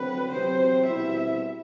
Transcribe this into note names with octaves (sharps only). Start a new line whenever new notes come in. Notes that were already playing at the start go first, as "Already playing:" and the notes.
Already playing: D3 F#3 C4 B4
C3 F#3 C4 C5
B2 G3 C4 E4 E5